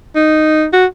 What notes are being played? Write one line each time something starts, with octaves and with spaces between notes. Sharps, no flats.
D#4
F#4